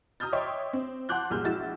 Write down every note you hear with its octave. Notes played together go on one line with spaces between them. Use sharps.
A#5 D#6 F6 G6 A6
C#5 D#5 E5 G5 C6 D6
C4
F#5 A5 C6 D6 F#6 G6
C2 F#2 A#2 G#4 F6 G6
A#1 G#3 E4 F#4 A6 E7